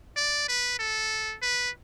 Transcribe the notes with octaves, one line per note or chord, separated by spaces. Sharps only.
D5
B4
A4
B4